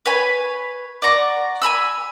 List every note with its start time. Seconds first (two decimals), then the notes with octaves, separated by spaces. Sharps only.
0.06 B4 C#5 G#5 B5
1.02 D5 F#5 A#5 C#6
1.62 G#5 A#5 B5 E6